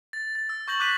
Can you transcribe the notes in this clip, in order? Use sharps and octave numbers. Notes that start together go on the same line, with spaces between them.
A6
A6
E6
C#6 G6 A#6 F#7
D6 F#6 G6 B6 D#7 F#7